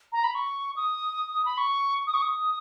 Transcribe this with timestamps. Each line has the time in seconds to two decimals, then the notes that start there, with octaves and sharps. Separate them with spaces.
0.12 A#5
0.24 B5
0.35 C#6
0.76 D#6
1.45 B5
1.58 C#6
2.07 D#6
2.14 C#6
2.22 D#6